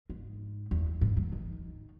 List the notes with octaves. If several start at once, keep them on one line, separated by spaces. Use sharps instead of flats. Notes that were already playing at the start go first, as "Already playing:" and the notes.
G#2
E2
G#2
E3
D#3